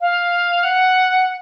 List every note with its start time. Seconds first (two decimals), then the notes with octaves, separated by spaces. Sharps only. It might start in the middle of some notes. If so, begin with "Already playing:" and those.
0.01 F5
0.63 F#5